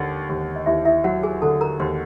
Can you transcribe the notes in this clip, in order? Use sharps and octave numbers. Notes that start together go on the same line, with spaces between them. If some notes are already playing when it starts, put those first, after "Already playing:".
Already playing: D#2 D3
D#2
D#5
D#2 E4 E5
E4 E5
F#3 F#4 F#5
G#4 G#5
D3 A4 A5
A#4 A#5
D#2 C5 C6